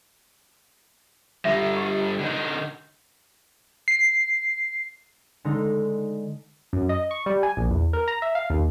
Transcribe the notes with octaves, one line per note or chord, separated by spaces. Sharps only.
D3 G3 E5
G4
D3 D#4
C7
D3 G#3 D#4
F#2
D#5
C#6
G3
G#5
A#1
E2
A#4
A#5
E5
F5
D#2